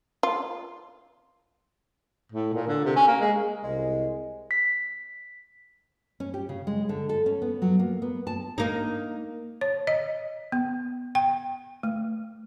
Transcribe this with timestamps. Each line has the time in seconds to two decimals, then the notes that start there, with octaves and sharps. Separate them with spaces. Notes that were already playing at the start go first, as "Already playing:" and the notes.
0.23 F4
2.32 A2
2.53 A#2
2.67 D3
2.85 C3
2.96 C#4
3.07 A#3
3.20 G#3
3.64 C2 G#3
4.51 B6
6.20 C#4
6.34 G4
6.49 C#3
6.67 G#3
6.89 D3
7.09 A4
7.26 C#4
7.42 B3
7.62 F#3
7.79 A#3
8.02 B3
8.27 A5
8.58 A#3 D#4
9.61 C#5
9.87 D#5
10.52 B3
11.15 G5
11.83 A3